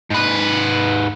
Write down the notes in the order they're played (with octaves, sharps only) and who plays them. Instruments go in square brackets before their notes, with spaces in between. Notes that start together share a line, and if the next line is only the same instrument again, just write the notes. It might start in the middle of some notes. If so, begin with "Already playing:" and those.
[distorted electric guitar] G#2 B4